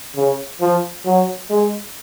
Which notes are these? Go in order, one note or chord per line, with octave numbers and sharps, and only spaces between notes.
C#3
F3
F#3
G#3